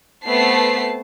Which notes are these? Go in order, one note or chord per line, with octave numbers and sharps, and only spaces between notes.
A3 B3 C4 A5 C7